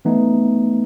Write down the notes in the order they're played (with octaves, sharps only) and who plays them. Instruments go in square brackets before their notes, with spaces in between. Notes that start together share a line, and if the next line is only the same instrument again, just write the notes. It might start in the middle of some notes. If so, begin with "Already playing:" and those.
[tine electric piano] E3 A3 B3 D#4